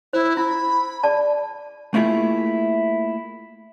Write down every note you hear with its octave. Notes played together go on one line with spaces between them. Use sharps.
E4 C5
E4 B5
G#4 D5 A5
A3 A#3 E4 F4 G#4